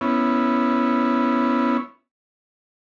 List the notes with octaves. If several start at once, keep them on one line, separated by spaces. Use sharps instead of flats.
B3 C#4 E4